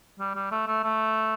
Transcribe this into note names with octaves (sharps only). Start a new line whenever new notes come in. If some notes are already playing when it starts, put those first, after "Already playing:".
G3
G3
A3
A3
A3